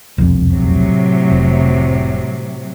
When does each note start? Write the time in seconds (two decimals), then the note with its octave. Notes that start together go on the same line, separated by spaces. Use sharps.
0.18 E1 C2 F2
0.51 A2 C3 F#3
1.31 F1